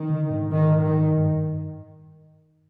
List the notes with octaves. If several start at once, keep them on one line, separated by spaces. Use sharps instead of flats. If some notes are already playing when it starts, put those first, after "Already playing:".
Already playing: D#3
D3
G#2
D#3
D#3
G2